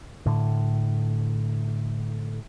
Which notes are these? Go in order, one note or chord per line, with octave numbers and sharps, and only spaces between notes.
A2 D3